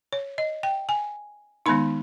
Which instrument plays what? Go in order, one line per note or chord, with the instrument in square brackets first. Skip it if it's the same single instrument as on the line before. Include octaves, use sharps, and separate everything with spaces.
[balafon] C#5
D#5
G5
G#5
D#3 G#3 B3 D#4 B5